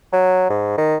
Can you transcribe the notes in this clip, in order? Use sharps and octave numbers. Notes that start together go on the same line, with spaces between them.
F#3
G#2
D#3